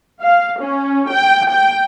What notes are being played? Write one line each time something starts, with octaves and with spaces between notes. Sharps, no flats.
F5
C#4
G5
G5